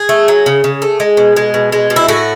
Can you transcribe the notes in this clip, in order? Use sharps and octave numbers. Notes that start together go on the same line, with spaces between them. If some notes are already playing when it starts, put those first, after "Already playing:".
Already playing: G#4
A3
F#3
C#3
C#3
A3
G#3
B2
G#3
B2
G#3
B2
E4
A2 F#4